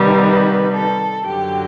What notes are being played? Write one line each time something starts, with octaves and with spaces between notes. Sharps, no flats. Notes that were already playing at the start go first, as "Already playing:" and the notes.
Already playing: C3 D#3 G3 B3
B4
A4
F#2 D3 F#3 G4